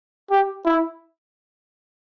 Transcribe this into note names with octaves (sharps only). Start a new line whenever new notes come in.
G4
E4